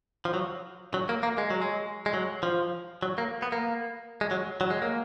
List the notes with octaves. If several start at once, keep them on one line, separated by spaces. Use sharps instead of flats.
F3
F#3
F#3
A#3
A#3
G#3
F#3
G#3
G#3
F#3
F3
F#3
A#3
B3
A#3
G#3
F#3
F#3
G#3
A#3